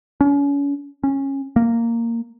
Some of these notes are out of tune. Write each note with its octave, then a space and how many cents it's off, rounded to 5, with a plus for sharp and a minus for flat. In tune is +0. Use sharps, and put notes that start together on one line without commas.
C#4 +35
C#4 -15
A#3 -10